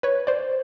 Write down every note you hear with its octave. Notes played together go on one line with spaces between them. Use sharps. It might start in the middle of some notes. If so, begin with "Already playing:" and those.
B4 C#5
C5 D5